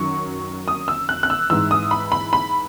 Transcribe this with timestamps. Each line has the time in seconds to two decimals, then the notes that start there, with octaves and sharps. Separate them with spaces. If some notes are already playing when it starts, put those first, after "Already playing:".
Already playing: F#2 D#3 F#3 C#6
0.68 D#6
0.88 E6
1.09 F#6
1.23 F#6
1.30 E6
1.50 G#2 E3 E6
1.71 D#6
1.91 B5
2.12 B5
2.33 B5